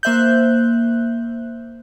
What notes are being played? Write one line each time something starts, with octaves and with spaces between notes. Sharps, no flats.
A#3 C5 E5 F#6 G6